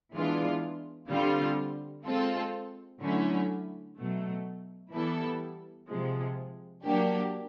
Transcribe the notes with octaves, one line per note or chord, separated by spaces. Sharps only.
E3 G#3 B3 D4 F4
D3 G3 C4 F4
G#3 C4 F4 A4
D3 F#3 A3 C#4 E4
B2 F#3 A3
E3 G3 B3 E4 A4
C3 F3 G#3
F#3 A#3 D4 G4